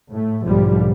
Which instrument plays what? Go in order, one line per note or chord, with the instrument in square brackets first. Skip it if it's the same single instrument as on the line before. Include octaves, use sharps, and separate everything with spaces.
[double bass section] A2 A3
B1 G#2 D3 F3 G3